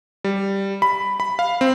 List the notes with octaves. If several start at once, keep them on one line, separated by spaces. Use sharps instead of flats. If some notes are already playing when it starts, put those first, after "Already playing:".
G3
B5
B5
F5
C4